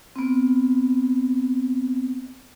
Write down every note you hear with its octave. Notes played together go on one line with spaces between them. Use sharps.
B3 C4